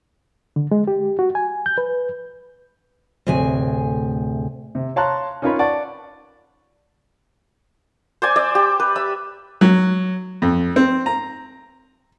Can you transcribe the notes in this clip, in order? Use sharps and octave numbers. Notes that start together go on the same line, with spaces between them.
D3
G#3
G4
F#4
G#5
G6
B4
D2 A2 C3 G#4 G#5
C3
C#5 F5 A5 A#5 C6 F#6
C#4 D#4 F4 A#4 C#5 B5
D5 F#5 A5 C#6
C5 D5 G#5
D5 E5
G4
B4
E5 B5
F#3
F2
C4
A#5